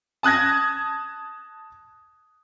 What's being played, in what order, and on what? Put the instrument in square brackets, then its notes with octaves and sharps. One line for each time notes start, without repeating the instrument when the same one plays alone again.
[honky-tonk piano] A5 D#6 F#6 G#6 A#6